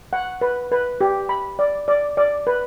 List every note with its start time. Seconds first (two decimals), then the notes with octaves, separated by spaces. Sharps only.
0.13 F#5
0.41 B4
0.72 B4
1.01 G4
1.29 B5
1.59 D5
1.88 D5
2.17 D5
2.47 B4